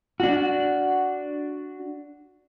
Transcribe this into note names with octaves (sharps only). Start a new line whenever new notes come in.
D4 F#4